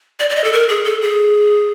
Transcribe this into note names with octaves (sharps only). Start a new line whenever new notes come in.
D5
D5
D#5
A4
A#4
G#4
A4
G#4